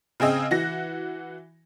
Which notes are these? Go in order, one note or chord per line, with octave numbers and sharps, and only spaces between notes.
C#3 C4 G#4 D#5 E6
E3 F#4 A#6